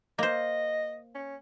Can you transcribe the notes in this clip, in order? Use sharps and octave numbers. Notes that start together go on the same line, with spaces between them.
A#3 C5 D#5
C#4